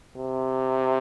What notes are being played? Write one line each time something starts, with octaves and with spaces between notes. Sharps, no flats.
C3